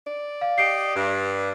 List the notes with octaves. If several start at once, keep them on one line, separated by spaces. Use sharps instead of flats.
D5
F5
G4 D#5 C7 D7
G2